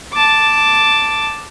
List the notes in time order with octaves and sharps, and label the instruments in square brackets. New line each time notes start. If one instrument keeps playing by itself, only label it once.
[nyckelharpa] A5 D6